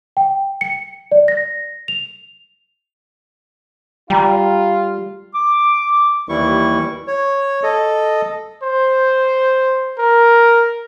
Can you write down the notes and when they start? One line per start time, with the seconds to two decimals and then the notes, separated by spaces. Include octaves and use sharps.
0.17 G5
0.61 C#7
1.12 D5
1.28 A#6
1.88 F7
4.10 G3 F4 G5 A#5 B5
5.34 D6
6.29 D#2 E3 G3 E4 C#6
7.07 C#5
7.63 A4 D#5
8.63 C5
9.98 A#4